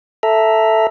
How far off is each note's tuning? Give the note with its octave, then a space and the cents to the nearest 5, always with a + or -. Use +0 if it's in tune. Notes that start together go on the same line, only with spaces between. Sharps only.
A4 +0 E5 +0 A#5 +10